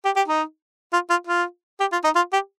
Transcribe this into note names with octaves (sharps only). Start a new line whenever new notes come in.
G4
G4
D#4
F4
F4
F4
G4
F4
D#4
F4
G4